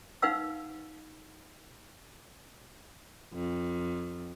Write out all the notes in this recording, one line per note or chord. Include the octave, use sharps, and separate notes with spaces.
D#4 B4 F5 F#5 E6
F2